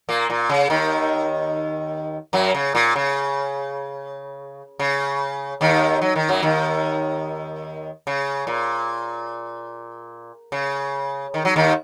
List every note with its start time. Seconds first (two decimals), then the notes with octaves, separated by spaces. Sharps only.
0.09 A#2 A#3
0.30 A#2
0.49 C#3
0.70 D#2 D#3
2.33 F#2 F#3
2.55 C#3
2.75 A#2
2.96 C#3
4.79 C#3
5.61 D#2 D#3
6.01 F#3
6.16 D#3
6.29 F#2 F#3
6.43 D#2 D#3
8.07 C#3
8.47 A#2
10.52 C#3
11.34 D#3
11.45 F#3
11.56 D#2 D#3